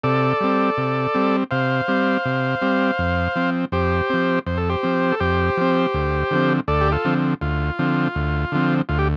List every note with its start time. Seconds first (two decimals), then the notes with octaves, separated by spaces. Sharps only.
0.04 C3 A4 D5
0.41 G3 C4
0.77 C3
1.15 G3 C4
1.51 C3 C5 F5
1.88 G3 C4
2.25 C3
2.62 G3 C4
2.99 F2
3.36 F3 C4
3.72 F2 G4 C5
4.10 F3 C4
4.46 F2 C5
4.57 A4
4.69 G4 C5
4.83 F3 C4
5.12 A4
5.20 F2 G4 C5
5.57 F3 C4
5.94 D2
6.31 D3 F3 C4
6.68 D2 A4 D5
6.81 G4
6.92 F4 A4
7.05 D3 F3 C4
7.41 D2 F4
7.79 D3 F3 C4
8.15 D2
8.52 D3 F3 C4
8.89 D2 F4
8.99 G4